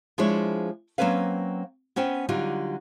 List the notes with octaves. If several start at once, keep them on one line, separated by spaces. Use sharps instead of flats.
F3 G#3 D4 E4 C#5
F#3 A#3 C4 C#4 B4 F5
B3 C#4 C5 G5
D3 F#3 G3 D#4 F4